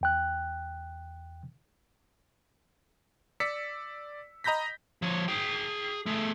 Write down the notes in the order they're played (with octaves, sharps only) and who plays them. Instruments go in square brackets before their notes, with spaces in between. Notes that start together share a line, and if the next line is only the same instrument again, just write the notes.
[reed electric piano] E2 G5 F#6
[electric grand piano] D5 E6 B6 C#7
D#5 A#5 B5 G6 A#6 B6
[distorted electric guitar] F3 C#5
G#4 G5
A3 G#4